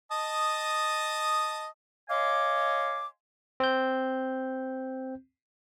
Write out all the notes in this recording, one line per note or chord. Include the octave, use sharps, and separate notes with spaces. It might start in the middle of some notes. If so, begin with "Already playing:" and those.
D#5 A5 D#6
C#5 D#5 F5 G#5 C6 D6
C4 G6